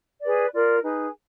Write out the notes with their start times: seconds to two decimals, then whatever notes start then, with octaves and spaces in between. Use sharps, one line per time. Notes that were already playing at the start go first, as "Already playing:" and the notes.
0.20 G#4 B4 D5
0.52 F4 A#4 D5
0.82 D#4 G#4 B4